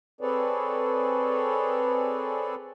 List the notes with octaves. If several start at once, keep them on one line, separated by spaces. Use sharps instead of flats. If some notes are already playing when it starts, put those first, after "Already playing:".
C4 G#4 A4 B4 C#5 D5